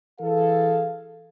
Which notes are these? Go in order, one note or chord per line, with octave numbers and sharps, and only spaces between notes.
E3 G#4 A4 F5